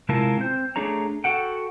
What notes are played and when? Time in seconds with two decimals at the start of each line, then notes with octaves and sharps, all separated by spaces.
0.09 C3 G#3 E4 F4 A#4 A5
0.37 C4 C5
0.76 A3 D4 G#4 C#5 A#5
1.24 F#4 A4 F#5 G5